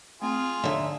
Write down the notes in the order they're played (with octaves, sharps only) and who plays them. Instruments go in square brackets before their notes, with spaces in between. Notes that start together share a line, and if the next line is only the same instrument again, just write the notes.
[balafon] A3 C4 [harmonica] F4 G#4
[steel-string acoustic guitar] D#2 E5 [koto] D3 [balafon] C#5